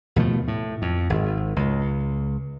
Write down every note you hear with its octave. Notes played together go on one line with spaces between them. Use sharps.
D#2 B2 F3 A3
A2
F2
G#1
C#2